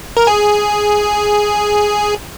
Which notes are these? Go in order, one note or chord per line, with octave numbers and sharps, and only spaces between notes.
A#4
G#4